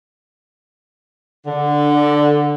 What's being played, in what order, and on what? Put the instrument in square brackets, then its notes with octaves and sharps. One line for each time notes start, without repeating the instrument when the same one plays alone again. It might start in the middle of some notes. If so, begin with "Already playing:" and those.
[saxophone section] D3